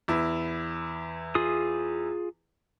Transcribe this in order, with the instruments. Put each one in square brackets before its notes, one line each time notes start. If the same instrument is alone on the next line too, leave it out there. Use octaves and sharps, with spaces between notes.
[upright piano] E2 E4
[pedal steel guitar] F4 G#4 D#6